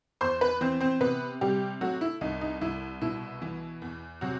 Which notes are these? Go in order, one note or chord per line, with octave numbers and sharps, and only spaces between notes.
E2 C5 C6
B4 B5
E3 C4 C5
C4 C5
C3 B3 B4
C3 G3 G4
F#3 A3 F#4
E4
C2 D#4
D#4
C2 E4
B2 E4
E3
E2
C3 F#3 F#4